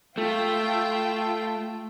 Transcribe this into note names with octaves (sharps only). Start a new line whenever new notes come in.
A3 F4 G5